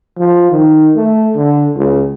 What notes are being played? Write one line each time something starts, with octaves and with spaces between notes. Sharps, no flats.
F3
D#3
A3
D3
C#2